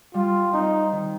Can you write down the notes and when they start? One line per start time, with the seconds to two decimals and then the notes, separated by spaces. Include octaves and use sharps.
0.14 G3 F4
0.53 C4 D#4
0.92 D#3